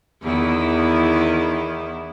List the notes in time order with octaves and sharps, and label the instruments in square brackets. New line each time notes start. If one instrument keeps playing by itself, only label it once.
[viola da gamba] E2 D#3 E4